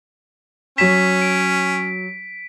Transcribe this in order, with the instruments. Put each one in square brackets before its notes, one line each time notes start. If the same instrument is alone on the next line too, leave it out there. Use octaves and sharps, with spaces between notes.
[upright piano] F#3 E7 [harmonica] C#4 [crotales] B6
[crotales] D7